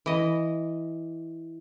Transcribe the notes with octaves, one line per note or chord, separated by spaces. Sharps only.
E3 D#5